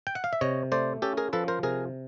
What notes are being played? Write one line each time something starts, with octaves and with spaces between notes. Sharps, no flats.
G5
F#5
F5
E5
C3 C#5 D#5
A3 C5 D5
C#4 G4 A4
G#4 A#4
F3 A4 B4
A#4 C5
C3 G#4 A#4